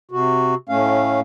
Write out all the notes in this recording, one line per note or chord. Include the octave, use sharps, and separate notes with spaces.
C3 F#4
A2 A3 C#4 F5